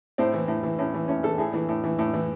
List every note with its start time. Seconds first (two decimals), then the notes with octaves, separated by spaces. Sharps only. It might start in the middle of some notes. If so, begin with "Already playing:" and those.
0.18 A2 C4
0.33 E3
0.48 A2
0.63 E3
0.78 A2 C#4
0.94 E3
1.08 A2 C#4
1.23 E3 A4
1.38 A2 G#4
1.54 E3
1.69 A2
1.84 E3
1.99 A2
2.13 E3